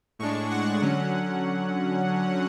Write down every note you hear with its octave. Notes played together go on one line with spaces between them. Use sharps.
A2 G#3 D4 C#6
F#5
D3 F#3 C#4